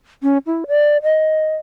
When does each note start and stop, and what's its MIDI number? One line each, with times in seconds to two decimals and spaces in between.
0.23 0.38 61
0.46 0.65 64
0.68 0.97 74
1.03 1.56 75